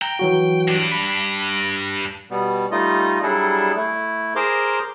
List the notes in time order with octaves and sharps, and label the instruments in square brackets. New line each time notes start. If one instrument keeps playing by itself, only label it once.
[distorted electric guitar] G5 [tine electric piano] A#5
[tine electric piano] E3 F#3 F#4
[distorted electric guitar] G2 D4
[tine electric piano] B5 B6
[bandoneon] B2 G3 B3
G3 A3 D#4 F4 D#5
F#3 G3 D4 E4 G#4 A4
A3 E4
G#4 A#4 C5 A#5 C6 D6